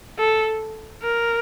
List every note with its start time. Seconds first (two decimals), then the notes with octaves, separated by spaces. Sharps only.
0.18 A4
1.02 A#4